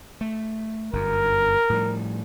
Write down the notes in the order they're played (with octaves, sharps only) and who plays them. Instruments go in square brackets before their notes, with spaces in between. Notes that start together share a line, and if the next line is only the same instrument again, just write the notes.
[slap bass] A3
[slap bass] G1 F#2 [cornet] A#4
[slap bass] A2 F3 G3